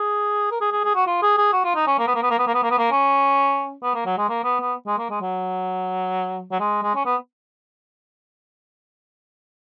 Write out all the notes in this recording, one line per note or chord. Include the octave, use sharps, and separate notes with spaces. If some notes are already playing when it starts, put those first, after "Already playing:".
Already playing: G#4
A#4
G#4
G#4
G#4
F#4
F4
G#4
G#4
F#4
F4
D#4
C#4
A#3
B3
A#3
B3
A#3
B3
A#3
B3
A#3
B3
A#3
C#4
B3
A#3
F#3
G#3
A#3
B3
B3
G#3
A#3
G#3
F#3
F#3
G#3
G#3
C#4
B3